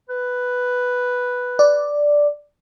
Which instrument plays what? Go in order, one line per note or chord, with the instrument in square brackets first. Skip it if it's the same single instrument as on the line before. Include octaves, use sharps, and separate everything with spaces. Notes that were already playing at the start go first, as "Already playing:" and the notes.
[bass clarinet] B4
[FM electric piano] D5